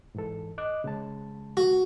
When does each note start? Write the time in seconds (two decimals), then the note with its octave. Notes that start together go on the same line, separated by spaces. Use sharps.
0.15 G#2 E3 A4
0.58 D#5 D6 F#6
0.84 C#3 G#3 A5
1.57 F#4